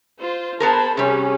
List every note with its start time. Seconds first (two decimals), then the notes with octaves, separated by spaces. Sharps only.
0.20 F4 C5
0.60 B3 G#4 A#4 C5 A5 B5
0.97 C3 G3 C#4 G4 G#4